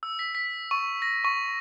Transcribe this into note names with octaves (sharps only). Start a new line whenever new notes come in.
E6
B6
B6
C#6
A#6
C#6